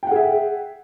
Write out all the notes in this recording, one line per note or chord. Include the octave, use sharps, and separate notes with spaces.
G#4 E5 F#5 G5